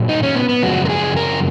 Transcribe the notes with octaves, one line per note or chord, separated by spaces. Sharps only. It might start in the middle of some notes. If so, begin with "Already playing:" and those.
Already playing: A#2 F#3
D#4
C#4
B3
B3
F#2 C#3 F3 G#3 F#4
A#4
G#4
A#4